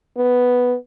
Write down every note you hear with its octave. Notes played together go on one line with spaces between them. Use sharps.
B3